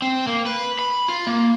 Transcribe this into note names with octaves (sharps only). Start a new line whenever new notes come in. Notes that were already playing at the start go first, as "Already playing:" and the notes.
C4
A#3
B4
B5
F4
A#3